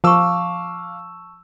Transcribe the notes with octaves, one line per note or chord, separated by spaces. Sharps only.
F3 F5 A5 C#6 D6 E6